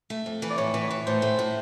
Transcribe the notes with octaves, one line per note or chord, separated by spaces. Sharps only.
A3
F2
E3
D5
A2 C#5
E3
C#5
E3
A2 C5
A3
A2